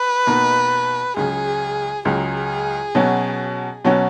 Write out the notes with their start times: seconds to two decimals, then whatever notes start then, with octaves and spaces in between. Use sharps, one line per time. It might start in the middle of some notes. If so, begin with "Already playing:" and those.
Already playing: B4
0.27 B2 A#3 D#4
1.16 C#2 C#3 F#3 G#4
2.05 C#2 C#3 F#3 G#4
2.95 B2 F#3 C#4 F#4
3.85 B2 F#3 C#4 F#4